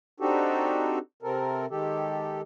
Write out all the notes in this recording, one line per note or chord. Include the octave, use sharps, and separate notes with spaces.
C4 D4 D#4 F#4 G4 A4
C3 C4 A4 A#4
D#3 G#3 G4 A4